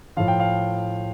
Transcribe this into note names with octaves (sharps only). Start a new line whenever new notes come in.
A2 F3 F5
G5
F5